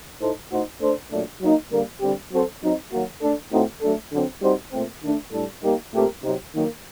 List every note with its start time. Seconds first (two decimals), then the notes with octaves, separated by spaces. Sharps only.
0.20 A2 A3 D#4 A4 C5
0.51 A2 A3 D#4 F#4 C5
0.80 A3 D4 A4 C5
1.11 A#2 F#3 A3 D4
1.41 F#3 A#3 D#4
1.71 D3 G3 A#3
2.01 D3 G3 C4 G4
2.31 F#3 C4 F#4 A4 C5
2.61 F#3 C4 D#4
2.92 D#3 F#3 A#3 F#4
3.21 A3 D4 A4
3.52 A2 A3 C4 D#4 F#4
3.82 F#3 A3 D4 A4
4.12 D3 F#3 C4
4.42 G3 C4 D#4 F#4 C5
4.72 A#2 A3 C4
5.02 D#3 A3 D4
5.32 A2 G3 D4 A4
5.62 G3 A#3 D#4 G4 A#4
5.93 A#2 A3 C4 G4 A#4
6.23 C3 F#3 C4 D#4
6.54 D#3 F#3 A#3